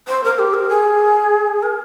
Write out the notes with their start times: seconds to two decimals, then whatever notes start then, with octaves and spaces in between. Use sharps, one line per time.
0.08 C5
0.24 A#4
0.39 G4
0.54 A#4
0.69 G#4
1.63 A#4